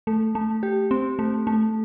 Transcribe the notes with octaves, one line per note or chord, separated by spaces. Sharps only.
A3
A3
G4
C4
A3
A3